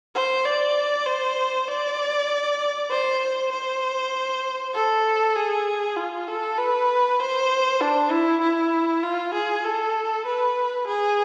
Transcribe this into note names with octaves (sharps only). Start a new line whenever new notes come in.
C5
D5
C5
D5
C5
C5
A4
G#4
F4
A4
B4
C5
D4
E4
E4
F4
G#4
A4
B4
G#4